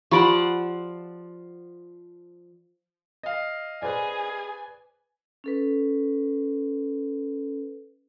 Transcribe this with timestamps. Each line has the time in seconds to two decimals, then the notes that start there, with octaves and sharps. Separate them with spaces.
0.11 F3 G4 D5 F#5 B5
3.23 D#5 F5
3.82 G#4 B4 C5 D5 G#5
5.44 C#4 A4 B4